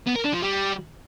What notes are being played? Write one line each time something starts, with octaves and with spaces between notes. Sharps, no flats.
B3
A#4
D4
F3
G3